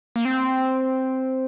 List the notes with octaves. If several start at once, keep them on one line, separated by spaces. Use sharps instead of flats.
A#3
C4